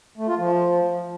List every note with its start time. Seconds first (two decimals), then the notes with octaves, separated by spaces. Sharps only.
0.18 A3
0.28 F4
0.39 F3